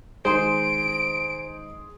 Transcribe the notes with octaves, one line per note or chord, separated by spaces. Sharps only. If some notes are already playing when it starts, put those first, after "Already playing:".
D#3 G#3 D#4 G#4 C5 C6 D7